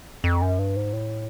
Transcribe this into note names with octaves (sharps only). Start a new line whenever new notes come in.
F2
F#2
G2
G#2
A2